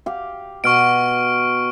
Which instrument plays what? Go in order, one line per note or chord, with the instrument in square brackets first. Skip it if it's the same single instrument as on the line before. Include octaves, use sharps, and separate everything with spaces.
[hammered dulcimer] G4 F5
[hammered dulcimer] B2 [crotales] C#6 F6 D7